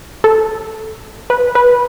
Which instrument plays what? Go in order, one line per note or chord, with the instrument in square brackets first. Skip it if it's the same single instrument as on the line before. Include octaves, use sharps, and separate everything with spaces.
[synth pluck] A4
B4
B4